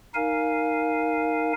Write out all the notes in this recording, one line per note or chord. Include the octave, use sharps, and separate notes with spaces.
D#4 A#4 F5 G#5